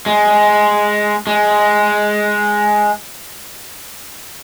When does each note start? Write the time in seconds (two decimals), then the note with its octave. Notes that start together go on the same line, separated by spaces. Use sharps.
0.06 G#3
1.27 G#3